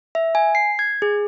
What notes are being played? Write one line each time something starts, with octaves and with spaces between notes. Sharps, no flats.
E5
G#5
C7
G#6
G#4